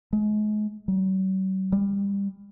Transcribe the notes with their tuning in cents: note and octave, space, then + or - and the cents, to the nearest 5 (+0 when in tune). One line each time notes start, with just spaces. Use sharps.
G#3 +35
F#3 +45
G3 +25